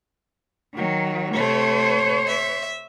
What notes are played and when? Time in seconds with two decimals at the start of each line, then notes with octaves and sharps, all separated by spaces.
0.74 D#3 F#3
1.35 C3 A3 C5 C#5
2.27 E5